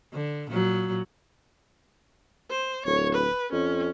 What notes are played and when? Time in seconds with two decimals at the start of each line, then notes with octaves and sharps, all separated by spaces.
0.13 D3
0.51 A#2 F#3
2.51 C5
2.86 D1 C#5
3.15 B4
3.52 F2 C#4